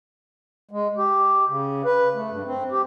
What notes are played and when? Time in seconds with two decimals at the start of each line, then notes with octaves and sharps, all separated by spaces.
0.71 G#3
0.97 G4
1.48 C#3
1.85 B4
2.15 A3
2.30 G2
2.46 C4
2.71 G4